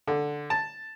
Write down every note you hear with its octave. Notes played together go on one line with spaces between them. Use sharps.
D3
A5